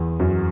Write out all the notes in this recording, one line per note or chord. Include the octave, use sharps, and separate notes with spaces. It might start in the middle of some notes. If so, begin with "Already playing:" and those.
Already playing: E2
F#2